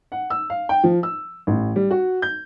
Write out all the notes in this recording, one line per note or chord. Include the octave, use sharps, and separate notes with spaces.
F#5
E6
F5
G5
F3
E6
A1
G3
F#4
G6